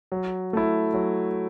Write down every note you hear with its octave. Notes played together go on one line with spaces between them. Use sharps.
F#3
A3 E4
F#3